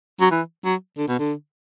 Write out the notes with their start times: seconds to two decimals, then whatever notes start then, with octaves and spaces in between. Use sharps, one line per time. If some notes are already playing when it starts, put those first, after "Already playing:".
0.21 F#3
0.31 E3
0.64 F#3
0.97 D3
1.08 B2
1.19 D3